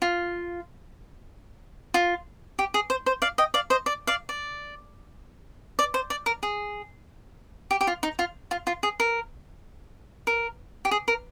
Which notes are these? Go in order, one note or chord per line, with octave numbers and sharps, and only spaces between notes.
F4
F4
G4
G#4
C5
C5
D5 F5
D#5 G5
D5 F5
C5 D#5
D5
D5 F5
D5
D5
C5
D5
A#4
G#4
G4
G4
F4
D#4
F4
F4
F4
G#4
A#4
A#4
G4
G#4
A#4